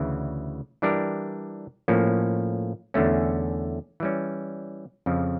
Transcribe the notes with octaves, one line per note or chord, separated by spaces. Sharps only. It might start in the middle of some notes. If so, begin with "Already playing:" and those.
Already playing: D2 C#3 E3
E3 G3 D4 G4 A#4
A2 F3 A#3 C#4
E2 D3 A3 C#4
E3 G3 C#4
F2 C#3 F3